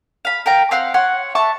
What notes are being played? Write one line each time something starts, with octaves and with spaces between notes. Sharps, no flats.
F5 B5
A#4 F5 G5 A#5
C4 F5 F#5 F6
C#5 F#5 C6
E5 A5 C#6